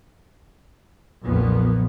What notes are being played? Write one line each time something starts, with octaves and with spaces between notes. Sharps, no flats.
B1 F2 A#2 F3 A#3 B3